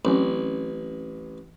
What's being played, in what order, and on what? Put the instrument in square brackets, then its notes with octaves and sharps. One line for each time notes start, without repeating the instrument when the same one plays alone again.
[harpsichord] A1 [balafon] F#3 C4 C#4